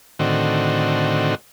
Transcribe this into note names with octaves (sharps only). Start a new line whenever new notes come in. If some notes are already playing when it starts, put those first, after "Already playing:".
A2 D3 D#3 C4 F#4